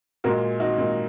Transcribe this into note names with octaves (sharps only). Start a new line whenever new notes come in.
A#2 G#3 F#4 A#4
D#4 F#4
A#2 G#3